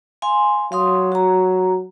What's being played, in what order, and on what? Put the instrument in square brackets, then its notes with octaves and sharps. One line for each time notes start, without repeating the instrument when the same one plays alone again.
[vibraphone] F5 G#5 C6
[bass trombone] F#3 [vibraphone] F5 C6 D#6
[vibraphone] F#4 A#5